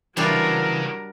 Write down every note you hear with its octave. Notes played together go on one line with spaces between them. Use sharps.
C#3 E3 F#3 G3 D4 F4 A#4 C#5